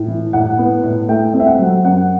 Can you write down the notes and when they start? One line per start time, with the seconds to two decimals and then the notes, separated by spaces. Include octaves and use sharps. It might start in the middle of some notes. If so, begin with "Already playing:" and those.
Already playing: A2
0.08 E3
0.33 A2 F#5
0.58 B3
0.83 A2
1.09 A3 G5
1.34 C4
1.40 E5
1.47 F#5
1.59 F#3
1.85 F#2 F#5